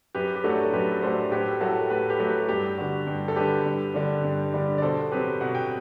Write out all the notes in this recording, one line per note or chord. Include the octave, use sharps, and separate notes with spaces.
F#2 G4 B4
G4
F#3 A3 D4 F#4 A4
F#2 G4 B4
F#3 A3 D4 A4 C5
A2 G4 B4
F#3 A3 F#4 A4
A2 G4 B4
G4 B4
F#3 A3
G4
G2 G4
D3 G3 F#4
G2
A4
D3 G3 G4 B4
G2
D3 G3 D4
G2
D3 G3 D4
D5
B2 A4 C5
F#3 C4 G4 B4
B2 F#5
G5